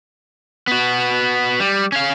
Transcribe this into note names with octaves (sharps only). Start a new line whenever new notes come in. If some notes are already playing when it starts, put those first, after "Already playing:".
B3 F#4
G3
C#4 F5